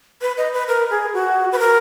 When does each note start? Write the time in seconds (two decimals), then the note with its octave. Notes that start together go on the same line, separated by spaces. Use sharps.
0.22 B4
0.38 D#5
0.53 B4
0.68 A#4
0.90 G#4
1.14 F#4
1.52 B4
1.59 A#4